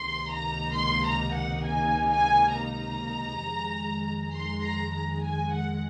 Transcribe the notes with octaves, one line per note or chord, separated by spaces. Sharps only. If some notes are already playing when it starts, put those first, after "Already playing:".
Already playing: C#2 C3 D#3 A#3 D#4 C6
A#5
C6
A#5
F#5
G#5
G#5
A#5
F2 D#3 G#3
C6
A#5
A#5
G#5
F#5